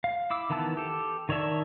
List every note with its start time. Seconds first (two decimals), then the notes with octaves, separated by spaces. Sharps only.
0.04 F5
0.30 E4 D6 E6
0.50 D#3 E3 B3 A5 E6
0.77 G4 A4
1.29 D#3 C#5 D5 E5 A5